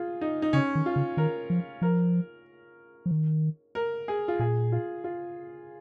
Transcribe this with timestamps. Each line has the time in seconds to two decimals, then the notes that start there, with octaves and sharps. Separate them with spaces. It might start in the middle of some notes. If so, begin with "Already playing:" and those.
Already playing: F4 G#4
0.21 D#4
0.42 D#4
0.53 C#3 C#4
0.75 D#3
0.86 F4
0.96 C#3
1.17 D#3 A#4
1.50 F3
1.82 F3 A#4
3.06 F3
3.11 D#3
3.75 A#4
4.08 G#4
4.28 F4
4.39 A#2 G#4
4.72 F4
5.04 F4